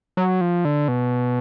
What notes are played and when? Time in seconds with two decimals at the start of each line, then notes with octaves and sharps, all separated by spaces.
0.17 F#3
0.41 F3
0.65 D3
0.88 B2